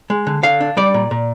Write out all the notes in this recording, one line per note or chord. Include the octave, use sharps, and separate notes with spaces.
G#3
D3
D3 F5
D4
G3 D5
A#2
A#2